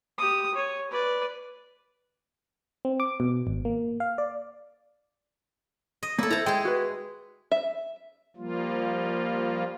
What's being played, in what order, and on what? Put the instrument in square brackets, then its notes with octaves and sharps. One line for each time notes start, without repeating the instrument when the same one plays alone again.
[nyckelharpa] G4 D#6
C#5
B4 D5
[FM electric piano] C4
D6
B2
G#1
A#3
F5
D5
[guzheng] D#5
[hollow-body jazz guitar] A#3 C#5 [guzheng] E4 A4
[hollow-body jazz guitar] E4 A4 C5 [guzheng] A5 A#5
[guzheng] G#3 G#4 [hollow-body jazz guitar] G5
[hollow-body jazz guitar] F#4 B4
[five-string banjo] E5
[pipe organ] F3 G3 A#3 F4